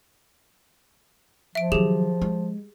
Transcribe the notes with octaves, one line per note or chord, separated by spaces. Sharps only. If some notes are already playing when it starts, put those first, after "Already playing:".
F3 E5 D7
D#3 F#3 G4 G#4 E7
G#3